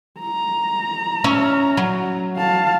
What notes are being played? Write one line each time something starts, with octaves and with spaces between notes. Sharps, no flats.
A#5
C#4 E5
F#3
F5 A5